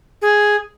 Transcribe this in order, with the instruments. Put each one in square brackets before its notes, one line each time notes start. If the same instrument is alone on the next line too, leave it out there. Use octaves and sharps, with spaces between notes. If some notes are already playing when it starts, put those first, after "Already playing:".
[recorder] G#4